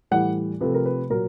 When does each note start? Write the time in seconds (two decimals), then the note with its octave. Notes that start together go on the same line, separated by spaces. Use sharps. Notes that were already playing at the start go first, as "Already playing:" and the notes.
0.11 A2 E3 G3 F#5
0.61 C3 F3 A3 B4
0.74 A#4
0.86 B4
1.10 A#2 F#3 A#4